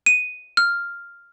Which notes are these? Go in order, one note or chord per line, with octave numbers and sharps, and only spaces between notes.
D#7
F6